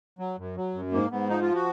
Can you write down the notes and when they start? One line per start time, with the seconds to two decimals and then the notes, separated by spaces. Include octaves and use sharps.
0.19 F#3
0.38 F#2
0.56 F#3
0.74 F#2
0.92 G#2 A#3
1.11 G#2 B3
1.29 F3 D#4
1.42 F4
1.55 F#4